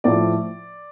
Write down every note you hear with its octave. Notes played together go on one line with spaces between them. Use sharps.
A2 F3 D5